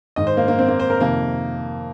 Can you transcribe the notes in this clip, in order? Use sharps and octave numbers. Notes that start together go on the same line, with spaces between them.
G#2 D#3 D#5
C5
A#3
A#3
C4
A#3
C5
A#4
F2 C3 D#3 A#3